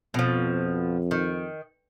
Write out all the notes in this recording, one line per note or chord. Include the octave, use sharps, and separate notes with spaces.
F2 B2 F3
D#3